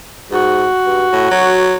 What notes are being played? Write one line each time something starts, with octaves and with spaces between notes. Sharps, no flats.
G#2 F#4
G2
A2
F#3